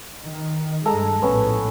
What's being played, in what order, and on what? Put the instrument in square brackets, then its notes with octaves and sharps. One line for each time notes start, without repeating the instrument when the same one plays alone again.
[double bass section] D#3
[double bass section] G2 G#3 [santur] A4 A#5
[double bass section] A#1 A2 [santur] B3 C#4